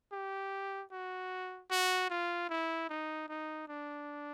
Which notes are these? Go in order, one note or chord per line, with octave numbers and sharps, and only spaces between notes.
G4
F#4
F#4
F4
E4
D#4
D#4
D4